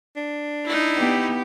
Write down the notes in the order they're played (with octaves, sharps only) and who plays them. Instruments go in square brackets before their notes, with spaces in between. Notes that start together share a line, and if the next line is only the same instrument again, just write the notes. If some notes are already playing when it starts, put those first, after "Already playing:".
[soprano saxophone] D4
[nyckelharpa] D#4 E4
[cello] B3 G4